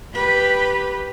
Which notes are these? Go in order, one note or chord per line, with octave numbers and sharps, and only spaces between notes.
G4 B4